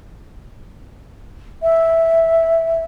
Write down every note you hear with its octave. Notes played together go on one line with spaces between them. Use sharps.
E5